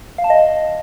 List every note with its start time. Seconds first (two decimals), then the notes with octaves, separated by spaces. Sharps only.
0.18 F5
0.24 A5
0.30 D#5